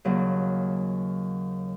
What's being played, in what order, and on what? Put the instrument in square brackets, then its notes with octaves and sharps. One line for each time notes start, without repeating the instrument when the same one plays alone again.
[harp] D#2 C#3 F#3